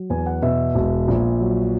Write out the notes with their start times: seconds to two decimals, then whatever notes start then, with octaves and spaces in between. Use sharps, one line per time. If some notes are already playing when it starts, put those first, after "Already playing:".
Already playing: F#3
0.10 E2 G#5
0.26 F#5
0.42 B2 E5
0.75 E1
1.08 A#1
1.40 F#3